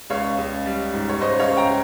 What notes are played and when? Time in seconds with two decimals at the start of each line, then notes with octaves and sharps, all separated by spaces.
0.10 C#2 C#5 F5
0.38 C#2
0.66 G3
0.94 G#2
1.09 C#5
1.20 C#2 C5 D#5
1.39 C#5 F5
1.48 C#3
1.57 G5 A#5